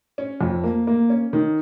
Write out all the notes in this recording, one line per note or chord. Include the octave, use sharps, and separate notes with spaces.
C#4
F2
A#3
A#3
C#4
D#3